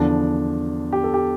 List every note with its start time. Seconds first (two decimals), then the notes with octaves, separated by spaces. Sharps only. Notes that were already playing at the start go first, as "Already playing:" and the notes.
Already playing: E2 D3 F3 D4
0.93 G4
1.03 A4
1.14 G4